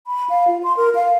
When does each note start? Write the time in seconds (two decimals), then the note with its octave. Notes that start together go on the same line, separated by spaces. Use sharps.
0.07 B5
0.30 F5
0.48 F4
0.63 C6
0.77 A#4
0.95 F5